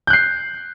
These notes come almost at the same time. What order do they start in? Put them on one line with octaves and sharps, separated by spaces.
G6 F#6 C7